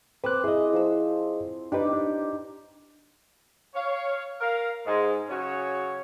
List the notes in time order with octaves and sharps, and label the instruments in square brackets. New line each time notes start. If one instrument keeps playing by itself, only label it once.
[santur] C4 D6 E6 [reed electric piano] B4 F#6
[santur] E4 [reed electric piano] G#4 D#5
[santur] F3 E6
[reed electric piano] D4 B4 [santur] D#4 G4 D6
[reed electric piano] D4
[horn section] C#5 F5
A#4 F5
G#2 G#3
C#3 F#3 C#4 F#4 C#5